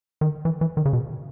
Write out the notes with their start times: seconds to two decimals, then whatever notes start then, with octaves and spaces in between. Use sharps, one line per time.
0.21 D#3
0.45 E3
0.61 E3
0.77 D#3
0.85 C#3
0.93 B2